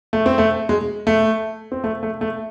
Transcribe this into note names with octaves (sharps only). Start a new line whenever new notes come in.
A3
C4
A3
G#3
A3
C4
A3
A3
A3